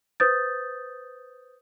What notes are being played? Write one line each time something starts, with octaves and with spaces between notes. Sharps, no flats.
B4 C5 D#6 G6 A6